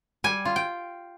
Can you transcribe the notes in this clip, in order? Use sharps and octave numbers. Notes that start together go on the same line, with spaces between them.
G3 G#5
F4
G5